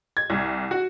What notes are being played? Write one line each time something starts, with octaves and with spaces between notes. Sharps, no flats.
G#6
C2
F#4